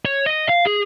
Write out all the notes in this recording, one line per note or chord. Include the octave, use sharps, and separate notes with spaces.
C#5
D#5
F5
G#4